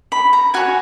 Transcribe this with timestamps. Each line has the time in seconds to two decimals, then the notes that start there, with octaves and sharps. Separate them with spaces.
0.12 B5
0.33 A#5
0.54 F#4 C#5 G#5